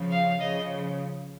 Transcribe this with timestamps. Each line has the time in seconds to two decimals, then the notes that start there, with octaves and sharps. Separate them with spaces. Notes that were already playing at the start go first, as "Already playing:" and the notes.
Already playing: C#3 F3
0.11 F5
0.39 C#3 F3 D#5